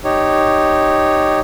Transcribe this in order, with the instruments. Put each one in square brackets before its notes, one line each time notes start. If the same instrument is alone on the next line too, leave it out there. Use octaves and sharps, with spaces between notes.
[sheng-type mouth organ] D#4 G4 C#5